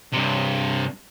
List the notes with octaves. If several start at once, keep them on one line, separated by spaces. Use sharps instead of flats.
G2 C3